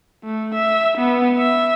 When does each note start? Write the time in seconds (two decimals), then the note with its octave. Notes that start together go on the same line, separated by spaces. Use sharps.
0.24 A3
0.54 E5
0.97 B3
1.37 E5